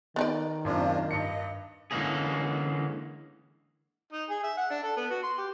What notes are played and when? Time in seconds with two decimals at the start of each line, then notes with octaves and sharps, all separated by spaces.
0.16 D#3 B3 D#4 D5
0.65 F#2 C3 A#3 D4 F4
1.11 G2 D#5 C#7
1.91 D3 E3 G#3 A#3 C#4 G#4
4.12 D#4
4.29 G#4
4.43 E5
4.57 F#5
4.71 D4
4.83 A4
4.97 B3
5.10 F#4
5.23 C6
5.38 G4